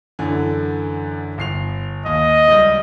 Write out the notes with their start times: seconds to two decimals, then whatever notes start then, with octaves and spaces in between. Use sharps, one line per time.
0.19 F#2 D3 E3
1.38 G1 C7 F7
2.06 D#2 D#5
2.48 C#2 G3